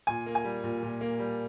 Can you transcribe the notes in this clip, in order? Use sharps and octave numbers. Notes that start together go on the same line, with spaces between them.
A#2 G#5
A#3
G#5
G3
A#2
A#2
A#3
G3